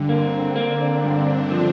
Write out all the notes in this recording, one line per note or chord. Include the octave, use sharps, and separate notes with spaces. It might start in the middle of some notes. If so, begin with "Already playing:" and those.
Already playing: G2 D3
A#3 C4
A#3 D4
G2 D4
F3